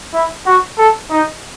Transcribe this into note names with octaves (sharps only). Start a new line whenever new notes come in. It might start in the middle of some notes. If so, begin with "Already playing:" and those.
E4
F#4
A4
D#4